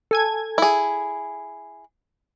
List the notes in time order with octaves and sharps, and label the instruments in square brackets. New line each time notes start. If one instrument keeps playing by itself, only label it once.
[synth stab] A4 G#5 G#6
[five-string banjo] E4 G#4